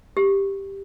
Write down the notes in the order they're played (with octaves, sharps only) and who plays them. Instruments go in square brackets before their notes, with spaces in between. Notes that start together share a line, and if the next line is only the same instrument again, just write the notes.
[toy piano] G4